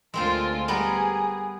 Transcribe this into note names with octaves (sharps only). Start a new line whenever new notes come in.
D2 G#3 C4 F4 A#4 C5
G3 B3 G#4 A#4